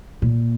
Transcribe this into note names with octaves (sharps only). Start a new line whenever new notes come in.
A#2